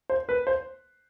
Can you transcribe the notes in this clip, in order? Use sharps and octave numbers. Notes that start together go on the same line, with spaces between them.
C5
B4
C5